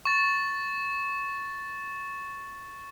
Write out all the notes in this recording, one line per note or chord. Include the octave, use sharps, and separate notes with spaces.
C#6 A6